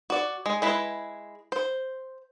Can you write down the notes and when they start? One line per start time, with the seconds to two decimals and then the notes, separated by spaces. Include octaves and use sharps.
0.10 F#4 D5
0.46 G#3
0.62 G#3 E4 B4
1.52 C5